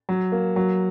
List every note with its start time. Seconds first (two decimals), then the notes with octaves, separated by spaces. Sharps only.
0.09 F#3
0.32 A#3
0.56 F#3